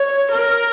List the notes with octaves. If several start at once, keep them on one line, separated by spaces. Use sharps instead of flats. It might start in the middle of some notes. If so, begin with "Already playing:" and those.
Already playing: C#5
A#4